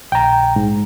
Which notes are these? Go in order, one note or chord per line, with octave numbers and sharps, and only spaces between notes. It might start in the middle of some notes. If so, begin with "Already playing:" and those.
A#1 G5 A#5
G#2